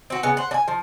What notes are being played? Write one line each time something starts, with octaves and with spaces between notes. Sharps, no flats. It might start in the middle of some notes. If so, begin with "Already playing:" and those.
C4 F#4
C#3 B3
C5 F#5
D4 G#5
F3